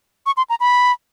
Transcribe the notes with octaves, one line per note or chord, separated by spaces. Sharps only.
C#6
C6
A#5
B5